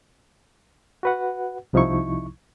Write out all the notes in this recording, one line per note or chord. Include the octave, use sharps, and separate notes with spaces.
F#4 B4 F#5
C2 C3 F3 D#4 E4 C#6